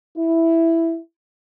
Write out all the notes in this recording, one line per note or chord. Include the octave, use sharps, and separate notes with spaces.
E4